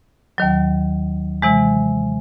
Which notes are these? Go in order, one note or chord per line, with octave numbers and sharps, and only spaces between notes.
D#2 D#3 F#3
C3 E3 G#3